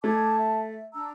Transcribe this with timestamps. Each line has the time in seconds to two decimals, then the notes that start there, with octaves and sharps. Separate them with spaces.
0.04 A3 D#4 A5 D6 G#6
0.37 E5
0.94 D4 A#5 E6